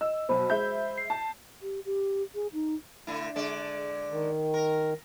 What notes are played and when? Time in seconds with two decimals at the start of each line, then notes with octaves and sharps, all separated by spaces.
0.01 D#5 E6
0.29 B1 B2 C5 B5
0.50 G#3 E5 G6
0.98 C7
1.10 A5
1.62 G4
1.85 G4
2.35 G#4
2.53 D#4
3.07 D3 A3 E4
3.36 D3 G#3 D5
4.11 D#3
4.54 A#4